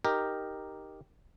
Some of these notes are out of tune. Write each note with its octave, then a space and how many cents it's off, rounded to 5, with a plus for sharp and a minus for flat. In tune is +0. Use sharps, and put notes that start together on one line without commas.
D#4 +0 G4 +0 A#4 +0